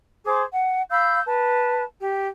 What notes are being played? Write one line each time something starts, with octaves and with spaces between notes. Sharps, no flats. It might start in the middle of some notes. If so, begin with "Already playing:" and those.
G#4 C5 D6
F#5
F5 B5 E6 G6
B4 A5
G4